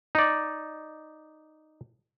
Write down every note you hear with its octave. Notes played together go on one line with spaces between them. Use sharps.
D#4 D5